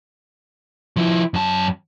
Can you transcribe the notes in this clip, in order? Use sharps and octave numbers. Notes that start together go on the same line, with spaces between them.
F3 E4
F#2 A5